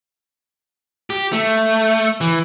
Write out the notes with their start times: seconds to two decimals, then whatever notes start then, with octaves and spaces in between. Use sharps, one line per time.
1.10 G4
1.33 A3
2.21 E3